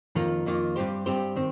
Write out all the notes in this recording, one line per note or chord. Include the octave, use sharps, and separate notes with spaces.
F2 D#3 A#3 F4
F2 D#3 A#3 F4
G2 G3 C4 G4 C5
G2 G3 C4 G4 C5
D#3 C4